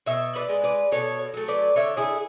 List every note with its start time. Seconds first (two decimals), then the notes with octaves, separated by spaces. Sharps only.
0.06 B2 C#5 E5
0.35 B4 D5
0.49 G#3
0.64 B4 D5
0.92 B2 A4 C#5
1.34 F#3 A3
1.48 B4 D5
1.76 D3 C#5 E5
1.97 E4 G#4